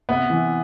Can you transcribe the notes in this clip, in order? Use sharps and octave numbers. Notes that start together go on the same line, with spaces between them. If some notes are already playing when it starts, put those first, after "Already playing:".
C3 B3
E3